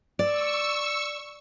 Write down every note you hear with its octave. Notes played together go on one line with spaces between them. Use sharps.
D5 C#6 E6